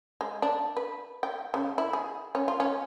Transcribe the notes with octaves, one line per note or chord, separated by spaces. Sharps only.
G#3
D4
B4
G5
C#3
E4
G#4
C#4
F4
C#4